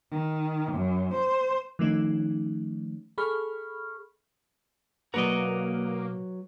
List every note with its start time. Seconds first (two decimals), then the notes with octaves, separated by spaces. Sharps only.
0.11 D#3
0.72 F#2
1.14 C5
1.79 D#3 F3 A3 C#4 D#4
3.18 G#4 A4 B5 C#6 F6
5.14 B2 F#3 A#3 F#4 B4 D5 D#5 A#5